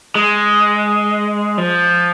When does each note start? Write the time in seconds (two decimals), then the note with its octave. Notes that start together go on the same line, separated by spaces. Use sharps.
0.15 G#3
1.58 F3